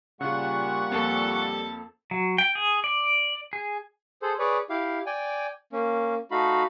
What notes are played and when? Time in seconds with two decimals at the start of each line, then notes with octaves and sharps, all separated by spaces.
0.21 A#2 C#3 G3 F4 F#5 C#6
0.91 F2 A#3 C4 A4 A5
2.11 F#3
2.38 G5
2.55 G#4
2.84 D5
3.53 G#4
4.22 G#4 A4 C5
4.39 G#4 B4 C#5 D5
4.70 E4 G4 F5
5.06 D5 G5 G#5
5.73 A#3 C#4
6.31 A3 D#4 F#4 F5 B5